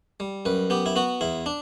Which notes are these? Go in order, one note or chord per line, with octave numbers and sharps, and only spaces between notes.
G3
F#2 B4
B3 G4
E4
B3 F#4
E2 E4
D4